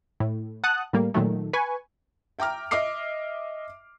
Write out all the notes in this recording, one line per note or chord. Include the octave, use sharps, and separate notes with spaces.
A2
F#5 A5 D#6 F#6
A2 G3 A#3
A#2 D#3 F#3 A3
B4 G#5 C#6
E5 G5 A#5 D6 F6
D#5 E5 D6 F6 C7